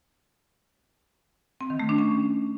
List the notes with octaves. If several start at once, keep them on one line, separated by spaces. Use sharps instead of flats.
C4
D#3
A3
D4
C#4